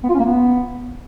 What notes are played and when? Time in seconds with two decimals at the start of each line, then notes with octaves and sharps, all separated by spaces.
0.04 B3
0.09 F4
0.14 C#4
0.20 A#3
0.25 B3